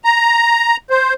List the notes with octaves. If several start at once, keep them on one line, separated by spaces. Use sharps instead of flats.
A#5
C5